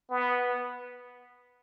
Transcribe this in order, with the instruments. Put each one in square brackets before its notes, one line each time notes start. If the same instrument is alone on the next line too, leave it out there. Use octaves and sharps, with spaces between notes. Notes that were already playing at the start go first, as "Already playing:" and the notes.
[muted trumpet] B3